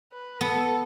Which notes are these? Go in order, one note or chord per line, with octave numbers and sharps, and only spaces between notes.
B4
B3 A4